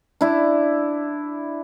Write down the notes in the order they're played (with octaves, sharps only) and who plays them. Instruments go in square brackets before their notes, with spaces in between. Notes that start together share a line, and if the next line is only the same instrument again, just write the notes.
[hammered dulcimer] D4 E4